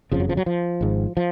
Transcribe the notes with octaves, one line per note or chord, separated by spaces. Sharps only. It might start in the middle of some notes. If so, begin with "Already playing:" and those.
F#1 F2 C#3 F3
F#3
F3
F#3
F3
G#1 G#2
F3